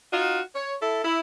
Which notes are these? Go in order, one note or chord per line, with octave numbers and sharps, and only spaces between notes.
D#4 F4 F#4
C#5
E4 A4
E4